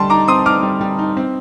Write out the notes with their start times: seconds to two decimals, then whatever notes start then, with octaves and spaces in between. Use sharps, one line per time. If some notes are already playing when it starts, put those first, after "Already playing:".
Already playing: D3 G3 A5 C6
0.10 D#4 A#5 D6
0.28 C4 C6 D#6
0.45 D#4 D6 F6
0.63 G3
0.81 G3
0.99 D#4
1.17 C4